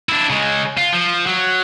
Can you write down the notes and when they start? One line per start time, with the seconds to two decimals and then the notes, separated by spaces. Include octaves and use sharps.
0.09 D4 E4
0.30 C#3 G#3
0.78 F4
0.93 F3
1.26 F#3